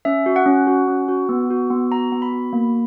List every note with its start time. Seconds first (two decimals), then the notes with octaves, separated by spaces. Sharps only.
0.05 C#4 E5
0.26 F#4
0.36 F#5
0.46 C#4
0.67 F#4
0.88 C#4
1.08 F#4
1.29 B3
1.50 F#4
1.70 B3
1.91 F#4 A#5
2.12 B3
2.22 B5
2.33 F#4
2.53 A#3